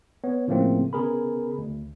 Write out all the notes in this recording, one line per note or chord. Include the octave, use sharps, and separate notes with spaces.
B3 C#5
A2 C#3 F3 A3 A#3 C4
C#3 B3 G#4 A#4 B5
D2